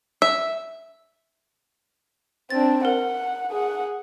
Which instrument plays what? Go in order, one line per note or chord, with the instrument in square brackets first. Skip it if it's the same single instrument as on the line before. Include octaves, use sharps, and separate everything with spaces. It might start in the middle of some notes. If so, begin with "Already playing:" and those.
[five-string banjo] E5
[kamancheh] C4 D4 [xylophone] A6
[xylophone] A#4 [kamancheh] F#5
[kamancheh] G#4 F#5